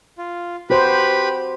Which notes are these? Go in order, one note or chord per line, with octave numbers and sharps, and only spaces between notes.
F4
F#4 G4 B4 C5 B5